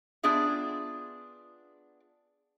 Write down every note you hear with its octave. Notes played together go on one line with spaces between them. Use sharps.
B3 D4 F4 G#4 E5